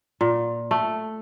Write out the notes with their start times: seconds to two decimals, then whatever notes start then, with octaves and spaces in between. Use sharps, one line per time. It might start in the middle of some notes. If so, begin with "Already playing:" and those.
0.21 A#2
0.71 A3